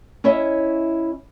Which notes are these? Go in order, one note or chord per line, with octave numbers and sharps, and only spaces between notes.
C#4 E4 C#5 D#5 E5